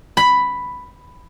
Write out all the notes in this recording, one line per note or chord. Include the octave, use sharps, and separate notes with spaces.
B5